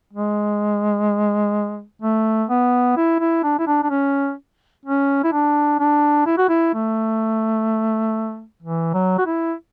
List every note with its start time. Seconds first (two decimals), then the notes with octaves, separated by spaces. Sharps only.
0.14 G#3
2.02 A3
2.50 B3
2.97 E4
3.20 E4
3.44 D4
3.59 E4
3.67 D4
3.83 D4
3.90 C#4
4.86 C#4
5.24 E4
5.33 D4
5.79 D4
6.27 E4
6.38 F#4
6.49 E4
6.74 A3
8.63 E3
8.94 F#3
9.19 F#4
9.26 E4